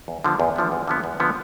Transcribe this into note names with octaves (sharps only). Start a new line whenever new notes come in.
E2
D3 F3 B3
E2
D3 F3 B3
E2
D3 F3 B3
E2
D3 F3 B3